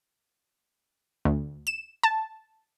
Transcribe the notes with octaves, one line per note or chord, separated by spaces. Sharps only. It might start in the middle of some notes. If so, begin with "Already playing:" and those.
D2
E7
A5